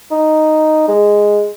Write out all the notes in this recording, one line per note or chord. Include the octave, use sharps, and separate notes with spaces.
D#4
G#3